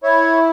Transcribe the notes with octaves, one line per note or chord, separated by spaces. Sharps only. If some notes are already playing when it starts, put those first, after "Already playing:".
E4 C#5